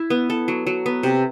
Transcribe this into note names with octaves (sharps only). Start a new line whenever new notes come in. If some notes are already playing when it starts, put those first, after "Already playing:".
Already playing: E4
B3
A4
F#3
F#3
B3
C3